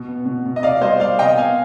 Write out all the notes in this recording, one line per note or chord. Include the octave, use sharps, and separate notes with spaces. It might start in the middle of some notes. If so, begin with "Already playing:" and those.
Already playing: B2
B3
B2
B2
D#5
C3 D5 F5
G3 C5 D#5
G3 D5 F5
C3 D#5 G5
B3 F5 G#5